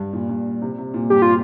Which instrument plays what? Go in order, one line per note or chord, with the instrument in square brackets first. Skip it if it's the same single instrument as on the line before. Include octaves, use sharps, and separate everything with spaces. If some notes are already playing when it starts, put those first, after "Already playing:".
Already playing: [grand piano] G2
A#2
G2
C3
C3
A#2
[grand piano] G2 [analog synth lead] G4
[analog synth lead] F4